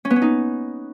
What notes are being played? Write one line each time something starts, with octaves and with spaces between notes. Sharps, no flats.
C#4
B3
C#4
D#4